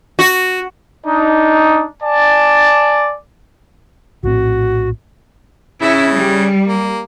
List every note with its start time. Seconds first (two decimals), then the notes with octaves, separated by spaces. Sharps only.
0.19 F#4
1.06 D4 D#4
2.03 D5 G#5 A5
4.23 A#1 A2 C4 F#4
5.82 C#3 C#4 E4
6.12 G3
6.67 A#3